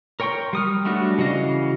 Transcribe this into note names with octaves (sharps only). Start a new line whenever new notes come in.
A#4 C#5 G5 C6 C#6
G3 D#6 F6
F#3 G3 A3 D4 F#4
C#3 E3 F#4 D#5 F5